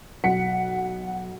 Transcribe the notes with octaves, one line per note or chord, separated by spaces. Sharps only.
B1 F#5 B6 C#7